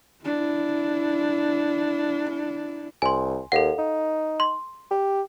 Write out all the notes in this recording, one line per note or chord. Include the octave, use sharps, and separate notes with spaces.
D4 E4
C2 G#5 C6
D#2 A4 F5 F#5
D#4
C6
G4